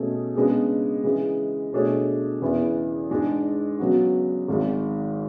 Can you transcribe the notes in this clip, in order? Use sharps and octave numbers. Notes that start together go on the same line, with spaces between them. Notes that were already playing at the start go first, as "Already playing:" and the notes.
Already playing: B2 A3 C#4 G#4
C#3 G#3 B3 D4 G#4
C#3 E3 G#3
B2 A3 D4 G#4 C#5
E2 C#3 E3 B3 E4
G#2 G#3 D4 G#4
C#3 F#3 B3 F#4
G#1 G#2 G#3